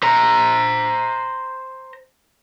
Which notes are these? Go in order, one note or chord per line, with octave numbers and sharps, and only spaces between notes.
C5 A#5